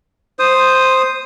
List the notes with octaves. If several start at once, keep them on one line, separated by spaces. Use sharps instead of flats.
C5 D#6